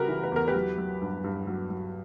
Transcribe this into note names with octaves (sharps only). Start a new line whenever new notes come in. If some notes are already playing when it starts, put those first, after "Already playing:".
Already playing: C#3 G3 F#4 G4 A#4 B4
E3
B4
E2 A#4
G4 B4
F#3
F#3
G2
G2
F#3
F#3